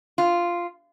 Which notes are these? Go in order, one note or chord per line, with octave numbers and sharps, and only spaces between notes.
F4